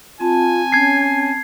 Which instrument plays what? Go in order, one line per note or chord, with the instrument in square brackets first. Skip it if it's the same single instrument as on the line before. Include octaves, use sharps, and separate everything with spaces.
[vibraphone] C4 A5 [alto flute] F4 [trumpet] G#5
[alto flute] C#4 [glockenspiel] G#6 C7